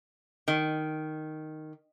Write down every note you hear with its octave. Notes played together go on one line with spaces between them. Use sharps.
D#3